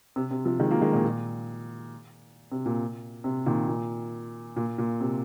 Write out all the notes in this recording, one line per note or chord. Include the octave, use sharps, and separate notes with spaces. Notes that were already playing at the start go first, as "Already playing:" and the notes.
C3
C3
C3 F3
D#3 G#3
F3 A#3
D#3 G#3
A#2 D#3
A#2
C3
A#2
C3
A#2 D#3
A#2
A#2
A#2
C3